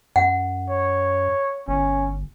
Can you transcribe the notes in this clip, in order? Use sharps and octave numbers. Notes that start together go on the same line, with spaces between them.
F#2 F#5
C#5
G1 C#4